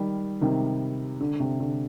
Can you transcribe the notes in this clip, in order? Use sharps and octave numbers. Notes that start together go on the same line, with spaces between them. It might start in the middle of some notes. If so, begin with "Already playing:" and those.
Already playing: D#3 G3
C3 D#3
D3
C3
D3